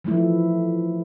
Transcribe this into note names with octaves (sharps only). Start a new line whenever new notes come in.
E3 F3 A3 E4